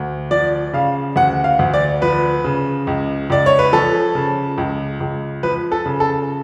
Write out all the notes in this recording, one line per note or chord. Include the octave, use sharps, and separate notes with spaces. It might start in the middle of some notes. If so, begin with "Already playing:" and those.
Already playing: D2
F3 D5
C#3 F5
D2 F#5
F5
D2
D5
F3 B4
C#3
C#2
C#2 D5
C#5
B4
F3 A4
C#3
C#2
C#2
F3 B4
A4
C#3
A4